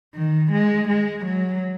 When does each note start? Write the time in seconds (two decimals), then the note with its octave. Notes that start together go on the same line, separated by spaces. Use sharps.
0.15 D#3
0.52 G#3
0.89 G#3
1.26 F#3